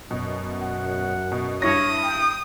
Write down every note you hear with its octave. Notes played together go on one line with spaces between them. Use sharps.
F#2 B2
F#5
B2
G2 E4 C#5 D#6 A#6
G5